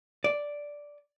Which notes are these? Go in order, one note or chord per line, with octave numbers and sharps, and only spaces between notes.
D5